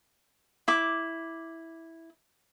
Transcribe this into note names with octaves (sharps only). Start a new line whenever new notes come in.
E4 D6